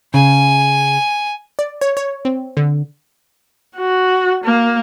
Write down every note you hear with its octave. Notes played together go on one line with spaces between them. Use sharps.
C#3 G#5
D5
C#5
C#5
C4
D3
F#4
A#3